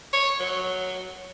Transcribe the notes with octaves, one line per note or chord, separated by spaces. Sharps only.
C#5
F#3